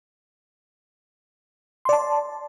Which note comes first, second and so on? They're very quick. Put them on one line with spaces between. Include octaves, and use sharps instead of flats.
C6 D5 A5